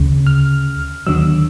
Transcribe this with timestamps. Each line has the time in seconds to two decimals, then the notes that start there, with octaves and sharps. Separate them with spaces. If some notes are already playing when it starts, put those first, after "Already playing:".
Already playing: D2 C#3
0.27 F6
1.07 D#2 D3 F#3 E6